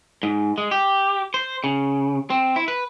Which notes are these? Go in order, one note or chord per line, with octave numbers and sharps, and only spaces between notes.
G#2
G#3
G4
C5
C#3
C4
E4
B4